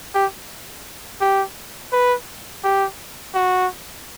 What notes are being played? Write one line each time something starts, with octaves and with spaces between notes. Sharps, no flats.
G4
G4
B4
G4
F#4